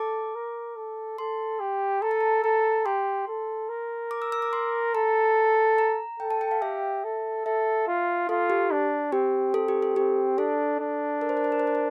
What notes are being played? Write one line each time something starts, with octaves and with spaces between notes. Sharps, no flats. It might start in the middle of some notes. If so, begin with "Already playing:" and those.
Already playing: A4 D6
A#4
A4
A4 C6
G4
A4 A#5
A5
A#5
A4 A#5
G4 C6
A4
A#4
D6
E6
E6
D6
C6
A4 A#5
A#5
A4 G5
A5
G5
F5
G4 E5
A4
A4 E5
F4
F4 A4
G4
D4
C4 G4
C4 A4
G4
A4
C4 G4
D4 A4
D4
A#4
C5
A#4
C5
A#4
C5
A#4
C5